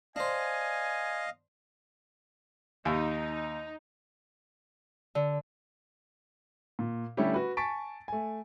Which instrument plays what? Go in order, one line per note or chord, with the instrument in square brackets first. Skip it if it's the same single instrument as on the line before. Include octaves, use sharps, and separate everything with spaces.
[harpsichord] D4 C5 [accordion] D#5 F5 [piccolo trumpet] G#5
[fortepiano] D#2 [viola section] D#4
[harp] D3
[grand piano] A#2
D3 G3 A3 C#4 E4 G4
F#4 B4
G#5 A5 C#6 A6 B6 D7
A3 G#5